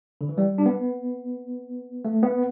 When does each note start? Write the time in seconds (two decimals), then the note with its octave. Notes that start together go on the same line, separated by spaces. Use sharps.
0.21 D3
0.29 E3
0.38 G3
0.58 D4
0.66 B3
2.05 A3
2.23 B3